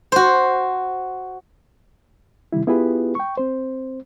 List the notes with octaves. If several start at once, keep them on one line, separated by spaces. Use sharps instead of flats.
F#4 C5
C3 D#3 G3 E4
B3 E4 F4 G4 G#4 B4
G5 C#6
C4 C5